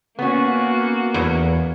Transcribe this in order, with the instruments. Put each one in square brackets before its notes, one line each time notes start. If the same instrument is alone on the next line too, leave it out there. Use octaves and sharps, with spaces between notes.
[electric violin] A#3 F#4 [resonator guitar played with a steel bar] B3 C#4
[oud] E2